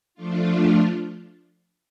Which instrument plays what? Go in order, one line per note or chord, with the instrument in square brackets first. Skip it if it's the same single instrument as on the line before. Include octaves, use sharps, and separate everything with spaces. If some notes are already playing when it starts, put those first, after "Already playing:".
[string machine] F3 A3 D4 F4